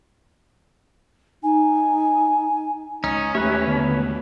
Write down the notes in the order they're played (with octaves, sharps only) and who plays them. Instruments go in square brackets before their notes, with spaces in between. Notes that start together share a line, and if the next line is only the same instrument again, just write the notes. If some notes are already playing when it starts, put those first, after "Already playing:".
[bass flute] D#4 [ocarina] G#5
[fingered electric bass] C#2 [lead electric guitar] C#4 [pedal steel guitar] D#4
[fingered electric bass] D#2 G#3 A3 [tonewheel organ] G4 E5 [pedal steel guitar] B4 C#5
[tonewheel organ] D3 B3